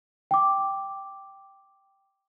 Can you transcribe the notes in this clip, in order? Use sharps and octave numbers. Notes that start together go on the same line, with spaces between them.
G5 D6